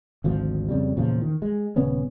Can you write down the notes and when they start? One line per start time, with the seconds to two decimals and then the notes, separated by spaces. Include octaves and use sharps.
0.24 G#1 D2 F3
0.69 F2 C#3 G3
0.97 E2 A#2 C#3 F3
1.22 D#3
1.42 G#3
1.76 D#1 C#3 B3 C#4